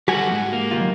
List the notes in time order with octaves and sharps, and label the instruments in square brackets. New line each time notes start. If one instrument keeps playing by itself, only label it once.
[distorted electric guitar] G3 A4 [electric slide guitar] F#4 [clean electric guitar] G4 G#5
[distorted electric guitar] G#2
[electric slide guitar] A#3
[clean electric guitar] C#2 D#3 F4